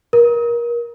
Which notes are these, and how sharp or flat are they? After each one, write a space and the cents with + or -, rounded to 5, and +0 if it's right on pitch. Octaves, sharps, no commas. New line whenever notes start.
A#4 +25